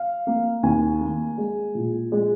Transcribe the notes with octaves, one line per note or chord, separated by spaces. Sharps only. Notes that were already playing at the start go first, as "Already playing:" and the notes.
Already playing: F5
A#3
D#2 G#5
A#3
G#3
A#2
G#3